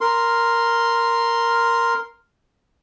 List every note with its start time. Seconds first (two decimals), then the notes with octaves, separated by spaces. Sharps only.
0.01 A#4 C6